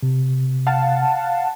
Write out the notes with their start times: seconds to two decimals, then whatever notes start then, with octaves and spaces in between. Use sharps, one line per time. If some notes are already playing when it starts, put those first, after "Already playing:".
0.03 C3
0.67 F5 F#5 A5